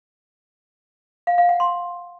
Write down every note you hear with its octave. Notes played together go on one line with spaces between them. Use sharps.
F5
F5
F#5
C6